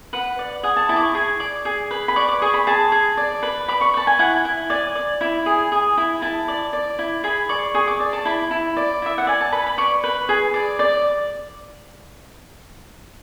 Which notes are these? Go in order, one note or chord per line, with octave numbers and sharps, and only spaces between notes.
B4 F#5
D5
G#4 F#5
A5
E4 A5
D6
C#6
G#4
D5
G#4
B4
B5
D5 C#6
D6
G#4 C#6
B5
G#4 A5
G#4
D5
B4
D5 B5
C#6
B4 A5
G#5
E4 F#5
E4
D5 G#5
D5
E4
G#4
G#4
E4
E4 A5
D5
D5
E4
G#4 B5
D5 C#6
G#4 C#6
D6
D5
A5
E4 B5
E4
D5
E4 E5
F#5
D5 G#5
A5
B4 B5
B5
D5 C#6
B4
G#4
D5
D5